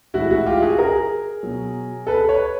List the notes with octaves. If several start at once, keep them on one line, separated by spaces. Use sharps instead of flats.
A2 E3 G#3 E4 F#4
E4 F#4
F4 G4
F#4 G#4
G#4 A#4
B2 F#3
A4 B4
B4 C#5